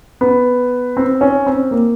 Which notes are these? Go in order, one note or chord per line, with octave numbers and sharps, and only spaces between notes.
B3
C4
C#4
C4
A#3